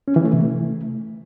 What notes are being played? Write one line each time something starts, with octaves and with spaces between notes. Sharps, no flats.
C#4
E3
A3
C3
A3